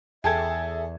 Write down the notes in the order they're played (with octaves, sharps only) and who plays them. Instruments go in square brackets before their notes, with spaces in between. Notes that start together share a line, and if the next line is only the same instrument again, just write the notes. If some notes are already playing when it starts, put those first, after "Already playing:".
[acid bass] E2 [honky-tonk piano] G#4 A4 [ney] E5 [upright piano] G5 A5 G#6